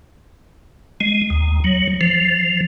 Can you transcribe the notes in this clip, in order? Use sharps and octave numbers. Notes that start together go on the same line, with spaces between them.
G#3
D#2
F#3
F3